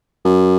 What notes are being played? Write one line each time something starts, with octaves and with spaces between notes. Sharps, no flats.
F#2